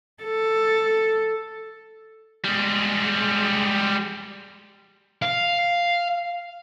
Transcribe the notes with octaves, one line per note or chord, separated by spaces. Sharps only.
A4
G3 G#3
F5